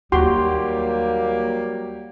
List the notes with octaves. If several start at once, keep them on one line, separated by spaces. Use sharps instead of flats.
D#2 F#3 G3 A#3 F#4 G4 C6